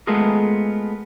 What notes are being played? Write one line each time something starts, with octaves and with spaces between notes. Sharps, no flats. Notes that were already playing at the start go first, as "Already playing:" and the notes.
G#3 A3 B3 F4 G#4 A#4